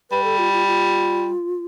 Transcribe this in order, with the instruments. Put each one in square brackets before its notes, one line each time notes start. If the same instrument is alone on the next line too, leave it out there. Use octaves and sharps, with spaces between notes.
[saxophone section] G3 [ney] B4
[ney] A4
F4
F4
F4